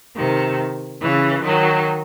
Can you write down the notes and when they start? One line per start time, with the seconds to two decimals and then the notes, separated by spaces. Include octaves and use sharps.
0.16 C3 D#3
1.01 C#3 E3
1.44 D#3 F#3